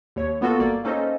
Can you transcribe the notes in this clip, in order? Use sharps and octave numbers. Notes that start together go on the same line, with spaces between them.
D#2 C#5
A#3 B3 F4 F#4 A4
G1 A#3 D5
A#3 C#4 D#4 A4 C5 D#5